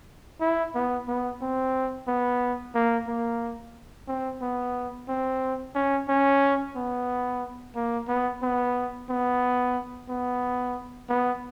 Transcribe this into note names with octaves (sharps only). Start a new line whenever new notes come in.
E4
B3
B3
C4
B3
A#3
A#3
C4
B3
C4
C#4
C#4
B3
A#3
B3
B3
B3
B3
B3